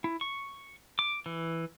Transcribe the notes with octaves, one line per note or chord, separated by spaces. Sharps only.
E4
C#6
D6
E3